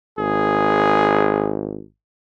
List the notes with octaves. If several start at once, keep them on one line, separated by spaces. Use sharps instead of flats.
G#1 G#4